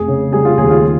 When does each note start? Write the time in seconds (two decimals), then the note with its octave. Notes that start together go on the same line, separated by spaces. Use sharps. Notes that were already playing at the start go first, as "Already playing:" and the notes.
Already playing: F1 G#4
0.08 C#3
0.33 G3 G#4
0.45 F4
0.57 D#2 G#4
0.70 F4